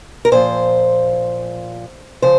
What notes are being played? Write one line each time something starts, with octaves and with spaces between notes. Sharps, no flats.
A#4
A#2 F3 C5
C#3 F3 C5